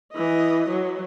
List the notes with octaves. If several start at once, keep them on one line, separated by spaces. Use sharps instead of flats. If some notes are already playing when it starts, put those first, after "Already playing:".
E3 D#5
F#3